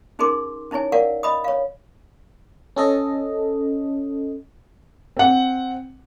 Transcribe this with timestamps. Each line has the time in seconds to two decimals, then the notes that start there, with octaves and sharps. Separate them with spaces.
0.19 C#4 D#4 G#4 A#4 C6 D6
0.71 C#4 D#4 E4 C#5 G#5
0.92 A#4 D5 F5 F#5
1.23 D#5 B5 D#6
1.44 C#5 F5
2.76 C#4 A4 D#5
5.17 C4 F#5